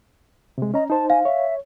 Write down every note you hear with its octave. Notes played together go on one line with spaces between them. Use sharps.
C3 G#3
C#4 D#5 A#5
D#4 C5 A5
F5 G#5
C#5 E5